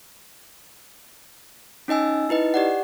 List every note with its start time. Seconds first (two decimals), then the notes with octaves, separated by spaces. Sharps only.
1.88 C#4 D#4 D#5 G#5 E6
2.29 D#4 E4 B4 D#5
2.54 G4 D5 F#5